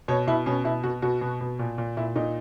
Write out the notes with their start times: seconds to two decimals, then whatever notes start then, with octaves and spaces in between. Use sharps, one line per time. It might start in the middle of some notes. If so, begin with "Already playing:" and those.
0.08 B2 C#5
0.27 B2 E4
0.46 B2 C#4
0.64 B2 E4
0.84 B2 F#4
1.02 B2 F#4
1.21 B2
1.41 B2
1.59 A#2
1.78 A#2
1.97 A#2 E4
2.16 A#2 D#4